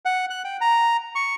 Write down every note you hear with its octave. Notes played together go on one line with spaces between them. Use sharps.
F#5
F#6
G5
A#5
C#6